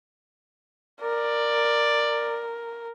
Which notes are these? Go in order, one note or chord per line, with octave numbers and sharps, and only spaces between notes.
A#4 D5